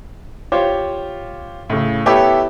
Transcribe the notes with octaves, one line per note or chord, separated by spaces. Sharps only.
F4 G4 C5 C#5
A2 C#3
B3 E4 G4 A4 C#5 B5